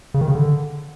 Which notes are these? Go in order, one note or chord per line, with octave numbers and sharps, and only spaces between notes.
C#3
D#3
C#3
D3